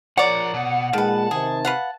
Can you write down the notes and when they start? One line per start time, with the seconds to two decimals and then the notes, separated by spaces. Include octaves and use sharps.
0.18 F3 A#4 C#5 D5 F#5
0.54 B2
0.93 A#2 D#3 G#3 B4 A5
1.31 C3 D#3 G#4
1.65 B4 F5 F#5